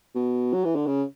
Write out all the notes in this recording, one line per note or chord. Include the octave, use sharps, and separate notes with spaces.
B2
F#3
E3
D3
C#3